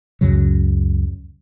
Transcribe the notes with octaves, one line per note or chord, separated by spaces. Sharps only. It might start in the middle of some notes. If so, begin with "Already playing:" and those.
C#2 F#2 C#3 F#3